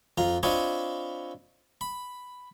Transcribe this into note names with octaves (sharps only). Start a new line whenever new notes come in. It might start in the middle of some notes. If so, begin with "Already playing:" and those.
F2 F4 A#5
C4 D4 F4 C#5 D#5 B5
B5